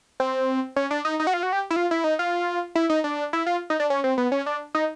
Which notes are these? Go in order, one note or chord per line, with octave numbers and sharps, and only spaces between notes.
C4
C#4
D4
D#4
D#4
F#4
F4
F#4
G4
E4
F4
E4
D#4
F4
E4
D#4
D4
E4
F4
D#4
D4
C#4
C4
B3
C#4
D4
D#4